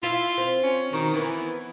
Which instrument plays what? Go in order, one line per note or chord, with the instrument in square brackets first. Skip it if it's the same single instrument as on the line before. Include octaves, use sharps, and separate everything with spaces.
[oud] E4 F5 [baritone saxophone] F4
[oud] C4
[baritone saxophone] C#4
[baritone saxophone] D#3 [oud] F#4
[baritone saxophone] E3 [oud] B3